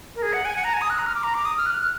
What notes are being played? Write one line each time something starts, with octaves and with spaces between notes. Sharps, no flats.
A#4
G#4
F#5
G#5
F#5
A#5
G#5
D#6
F#6
A#5
F6
D6
A#5
D6
D#6
F6
F#6
F6
F#6